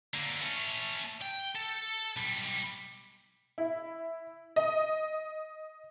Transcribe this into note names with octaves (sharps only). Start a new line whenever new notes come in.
D3 A#3
A3 C#4
G5
A4
B1 G3
E4
D#5